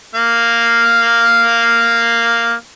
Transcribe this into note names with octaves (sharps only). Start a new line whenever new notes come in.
A#3 F5